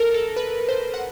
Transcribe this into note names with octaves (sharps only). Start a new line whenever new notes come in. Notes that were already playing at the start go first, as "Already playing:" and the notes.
Already playing: A4 A#4
A4
B4
C5
F#5